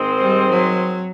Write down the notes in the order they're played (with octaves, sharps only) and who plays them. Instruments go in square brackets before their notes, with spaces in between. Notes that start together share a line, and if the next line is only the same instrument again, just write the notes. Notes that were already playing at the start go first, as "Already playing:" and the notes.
Already playing: [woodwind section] G#2 D#3 G#3 C4
[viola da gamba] G3
F#3